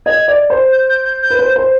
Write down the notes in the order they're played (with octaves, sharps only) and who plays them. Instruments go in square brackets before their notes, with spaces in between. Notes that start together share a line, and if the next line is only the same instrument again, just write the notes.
[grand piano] D#5 [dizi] G#6
[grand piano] D5
C5
[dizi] G6
G6
G6
G6
[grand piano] B4
C5
C5